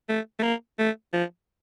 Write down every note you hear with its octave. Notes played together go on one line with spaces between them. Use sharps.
A3
A3
A#3
A3
F3